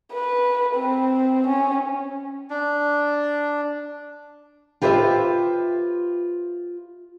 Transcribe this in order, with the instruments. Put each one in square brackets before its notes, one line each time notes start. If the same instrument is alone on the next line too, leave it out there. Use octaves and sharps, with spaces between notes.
[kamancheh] B4
C4
C#4
[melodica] D4
[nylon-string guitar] F4 G4 B4 C5 D#5 E5